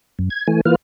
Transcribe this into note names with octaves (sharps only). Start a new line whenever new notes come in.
F#2
G#6
E3 A3 G#5
E3 A#3 F4 B4 F6